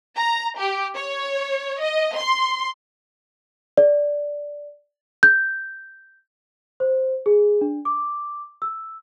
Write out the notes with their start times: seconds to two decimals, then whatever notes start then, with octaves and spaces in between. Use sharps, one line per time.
0.17 A#5
0.57 G4
0.96 C#5
1.81 D#5
2.15 C6
3.77 D5
5.23 G6
6.80 C5
7.26 G#4
7.61 D4
7.85 D6
8.62 E6